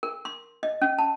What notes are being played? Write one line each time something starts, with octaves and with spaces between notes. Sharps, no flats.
A#4
C6
D#5
C#4
A5